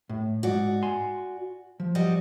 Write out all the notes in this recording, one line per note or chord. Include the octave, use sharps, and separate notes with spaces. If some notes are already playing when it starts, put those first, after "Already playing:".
A2
G#2 F#4 D5
G#5 C6
F3
G3 F#4 D#5